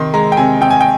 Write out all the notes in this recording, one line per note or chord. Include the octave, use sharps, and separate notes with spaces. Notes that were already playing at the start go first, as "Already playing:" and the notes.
Already playing: C3 D#3 C6
G#3 A#5
G5
C3 G#5
C3 G5
G#5
G5